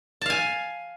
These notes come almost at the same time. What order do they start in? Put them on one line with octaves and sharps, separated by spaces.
A5 F5 G#5